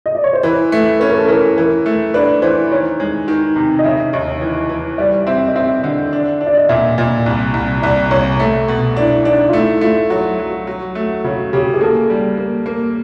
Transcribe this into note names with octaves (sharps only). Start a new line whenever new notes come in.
D#5
D5
C#5
C5
E3 B4
A3
C#4 B4
A#4
A4
E3 A#4
E3 A#4
A3
D4 B4
E3 C5
D#3 C#5
G#3
D#3
C3
D#5
C#3 E5
D#2 D#5
E3
E3
G3 D5
C4 E5
D#5
C4 E5
D3
D4
D4
D5
D#5
A#2 E5
A#2
C2
C2
C2 D5
C2 C#5
A3
B2
D4 E4
D4 D#4
F4
A3 E4
A3 F4
F#3 F#4
F#3
F#3
A3
C#3 F#4
C#3 G4
G#4
A#3 A4
G3
A#3
A#3